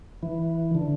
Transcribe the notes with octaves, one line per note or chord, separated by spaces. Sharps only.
E3
D3